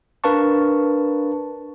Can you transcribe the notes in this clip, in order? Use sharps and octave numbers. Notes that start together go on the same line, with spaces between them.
D4 A#4 B4 F5 A5 C#6